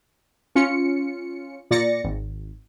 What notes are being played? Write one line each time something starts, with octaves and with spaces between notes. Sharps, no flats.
C#4 F4 C#7
A#2 D5 A6 A#6 C#7
G#1